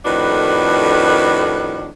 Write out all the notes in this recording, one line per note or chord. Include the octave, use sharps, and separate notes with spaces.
F2 A2 D#3 D4 F#4 B4